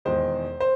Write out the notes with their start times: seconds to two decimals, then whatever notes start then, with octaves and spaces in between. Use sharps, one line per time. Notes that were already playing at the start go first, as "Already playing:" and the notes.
0.05 E1 E2 D#3 G#3 C5
0.60 C5